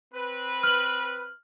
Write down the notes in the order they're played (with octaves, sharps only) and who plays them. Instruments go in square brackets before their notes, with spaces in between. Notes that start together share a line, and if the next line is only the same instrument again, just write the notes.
[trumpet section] C4 B4
[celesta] F6 F#7